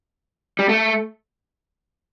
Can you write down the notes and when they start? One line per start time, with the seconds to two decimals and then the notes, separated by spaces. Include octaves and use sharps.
0.59 G3
0.69 A3